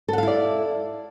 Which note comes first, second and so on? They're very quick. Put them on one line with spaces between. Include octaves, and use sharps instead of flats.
A4 F#5 F5 E4 D5